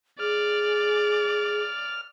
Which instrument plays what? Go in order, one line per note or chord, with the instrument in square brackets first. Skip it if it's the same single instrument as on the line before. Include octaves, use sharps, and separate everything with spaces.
[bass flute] G#4 [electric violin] D5 [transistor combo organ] F6